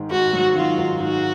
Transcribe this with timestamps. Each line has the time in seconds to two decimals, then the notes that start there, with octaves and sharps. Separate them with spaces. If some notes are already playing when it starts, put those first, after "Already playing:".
Already playing: G#2 D#3
0.11 G#2 F#4
0.33 F#3
0.55 D#3 F4
0.78 G#2
1.00 G#2 F#4